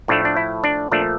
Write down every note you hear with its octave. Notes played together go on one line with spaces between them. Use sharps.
A2 F3 A3 D4
D4
E4
D4
A#2 F3 A3 D4